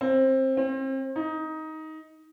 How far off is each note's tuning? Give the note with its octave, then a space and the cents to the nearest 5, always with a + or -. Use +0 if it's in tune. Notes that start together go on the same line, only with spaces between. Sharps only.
C4 +20
C4 +35
D#4 +15